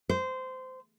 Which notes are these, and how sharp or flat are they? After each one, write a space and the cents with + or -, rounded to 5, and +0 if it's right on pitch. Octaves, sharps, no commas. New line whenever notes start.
C5 -20